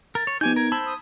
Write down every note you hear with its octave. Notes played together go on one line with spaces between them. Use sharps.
A#4 A6
C#5
F3 B3 D#4 G4 G#5 G6
A#4 G#6
C5 A5 B5 E6
D#6